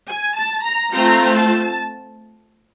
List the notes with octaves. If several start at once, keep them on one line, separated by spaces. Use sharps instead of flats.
G#5
A5
A#5
A3 C4 F4 A#5
A5